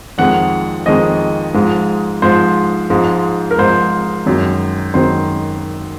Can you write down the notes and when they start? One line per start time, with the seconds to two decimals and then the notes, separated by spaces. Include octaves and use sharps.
0.18 F2 D#3 G#3 F#5
0.86 F2 D#3 G#3 D#5
1.54 G#2 F3 G#3
2.22 G#2 F3 G#3 C5
2.90 G#2 F3 G#3
3.51 A#4
3.58 G#2 F3 G#3 C5
4.26 F#2 D#3 G#3
4.94 F#2 D#3 G#3 C5